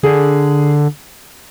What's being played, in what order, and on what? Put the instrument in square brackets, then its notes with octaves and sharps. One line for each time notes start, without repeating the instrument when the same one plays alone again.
[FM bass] D3 [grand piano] G#4